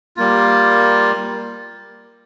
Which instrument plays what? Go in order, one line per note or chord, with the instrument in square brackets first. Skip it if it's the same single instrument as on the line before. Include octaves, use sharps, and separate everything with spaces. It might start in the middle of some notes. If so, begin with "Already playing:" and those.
[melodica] G3 A#3 F4